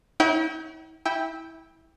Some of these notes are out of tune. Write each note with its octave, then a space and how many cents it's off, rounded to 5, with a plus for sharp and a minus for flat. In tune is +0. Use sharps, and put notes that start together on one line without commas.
E4 -45 C#5 +5 G5 -30
E4 -15 G5 +10